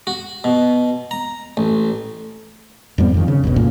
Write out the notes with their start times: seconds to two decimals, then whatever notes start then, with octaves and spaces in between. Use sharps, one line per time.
0.07 F#4
0.44 B2
1.11 A#5
1.57 A1
2.98 F2 G#2 G3 B3
3.14 F2 D#3
3.28 C#3
3.44 G1 D2 B2
3.56 C#2 G2 A#2 A#3